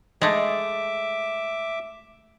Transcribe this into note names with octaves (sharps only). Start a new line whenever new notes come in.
G#3 A3 E5 D6